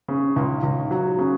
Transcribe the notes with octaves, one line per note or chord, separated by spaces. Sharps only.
C#3
C#2
C#2
F#3
C#3